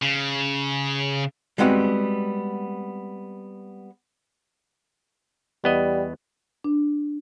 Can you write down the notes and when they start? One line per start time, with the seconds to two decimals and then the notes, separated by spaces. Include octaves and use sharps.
0.02 C#3
1.58 G3 G#3 B3 C4 D#4 F#4
5.64 E2 G3 B3 D#5
6.64 D4